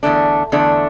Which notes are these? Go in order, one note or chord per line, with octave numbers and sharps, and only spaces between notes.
E2 D3 A3 D4
E2 D3 A3 D4